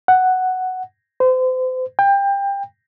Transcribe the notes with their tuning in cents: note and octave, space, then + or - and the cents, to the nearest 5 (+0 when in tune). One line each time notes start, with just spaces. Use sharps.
F#5 +5
C5 -35
G5 +25